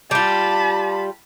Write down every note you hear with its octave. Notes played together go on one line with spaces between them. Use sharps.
G3 F4 A5 B5